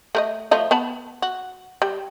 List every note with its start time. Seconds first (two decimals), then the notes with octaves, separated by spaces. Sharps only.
0.15 A3 A#4 D#5
0.51 F3 A3 D#5
0.71 B3 A5 B5
1.22 F#4
1.82 G3